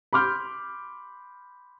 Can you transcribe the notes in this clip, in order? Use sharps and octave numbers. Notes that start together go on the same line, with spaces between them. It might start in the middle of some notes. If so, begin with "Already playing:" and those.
B5 C6 D6 F6 G6